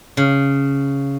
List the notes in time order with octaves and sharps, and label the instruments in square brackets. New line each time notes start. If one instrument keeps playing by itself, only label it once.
[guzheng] C#3